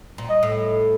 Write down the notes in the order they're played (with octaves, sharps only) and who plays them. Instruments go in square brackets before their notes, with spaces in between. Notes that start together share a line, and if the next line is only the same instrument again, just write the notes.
[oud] A#2
[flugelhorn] D#5
[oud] A2